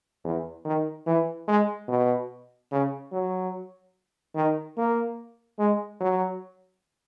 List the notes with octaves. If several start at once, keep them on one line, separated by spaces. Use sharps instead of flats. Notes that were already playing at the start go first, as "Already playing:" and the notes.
E2
D#3
E3
G#3
B2
C#3
F#3
D#3
A#3
G#3
F#3